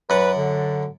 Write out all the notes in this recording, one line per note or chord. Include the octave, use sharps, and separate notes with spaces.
F#2 B4 F#5
D3